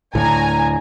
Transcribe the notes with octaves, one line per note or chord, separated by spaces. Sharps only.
D2 A2 G#5 A#5